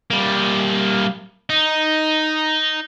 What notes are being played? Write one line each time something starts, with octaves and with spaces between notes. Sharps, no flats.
G3 A#3
D#4